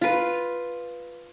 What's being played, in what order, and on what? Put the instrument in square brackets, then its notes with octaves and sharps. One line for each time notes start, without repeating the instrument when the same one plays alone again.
[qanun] F4 B4